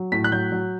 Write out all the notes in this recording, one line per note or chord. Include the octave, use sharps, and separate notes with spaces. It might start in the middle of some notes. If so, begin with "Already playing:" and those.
Already playing: F#3
A2 B6
F#6
F#3 G6
F#3